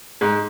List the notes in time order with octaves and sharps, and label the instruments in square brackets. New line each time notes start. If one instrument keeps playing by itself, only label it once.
[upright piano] G#2